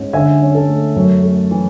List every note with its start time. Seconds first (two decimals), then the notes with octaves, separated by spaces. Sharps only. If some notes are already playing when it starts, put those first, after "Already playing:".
Already playing: G#2 C#4
0.13 D3 E5 G#5
0.41 C#4
0.55 A4
0.68 A3
0.96 F#2
1.23 A3
1.51 E3